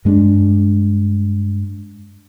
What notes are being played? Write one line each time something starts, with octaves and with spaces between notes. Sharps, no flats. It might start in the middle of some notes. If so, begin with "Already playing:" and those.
G2 G#3 C#4 D4